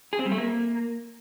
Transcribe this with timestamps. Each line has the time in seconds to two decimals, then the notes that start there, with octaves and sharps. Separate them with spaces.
0.13 G#4
0.19 C4
0.25 G3
0.32 A3
0.38 A#3